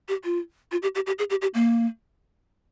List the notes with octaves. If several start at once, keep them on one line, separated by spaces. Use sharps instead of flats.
G4
F4
F4
G4
G4
G4
G#4
G4
G4
A#3